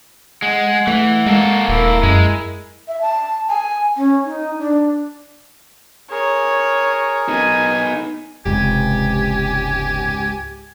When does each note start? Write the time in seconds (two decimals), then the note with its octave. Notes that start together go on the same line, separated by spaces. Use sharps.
0.42 G#3 F#5
0.87 E3 A3
1.26 G#3 A#3 A4
1.68 D#1 E4 A#4
2.03 F#2 G#3
2.88 E5
3.02 A5
3.48 G#5
3.97 C#4
4.24 D#4
4.59 D4
6.11 G#4 A#4 C#5
7.29 B3 D#4 G#5
8.46 F1 C#2 G#2 G4 G#5